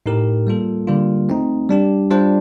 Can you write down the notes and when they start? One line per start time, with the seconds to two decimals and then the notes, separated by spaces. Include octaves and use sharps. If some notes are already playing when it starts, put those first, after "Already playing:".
0.06 A2 A3 D#4 G4 A#4
0.47 G3 A#3 F4 A4
0.87 D3 G3 A#3 F4
1.29 A3 C4 D#4
1.69 G3 D4 G4
2.10 G3 D4 F4 C5